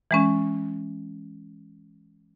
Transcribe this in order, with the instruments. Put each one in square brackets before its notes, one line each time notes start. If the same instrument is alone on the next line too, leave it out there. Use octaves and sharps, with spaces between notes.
[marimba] E3 G#3 C#4